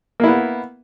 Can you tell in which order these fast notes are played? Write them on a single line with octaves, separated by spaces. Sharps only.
A#3 E4 B3